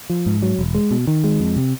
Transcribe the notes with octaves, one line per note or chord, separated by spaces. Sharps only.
F3
G#2
F#3
E1
G#3
B2
D#3
G#3
F2
C3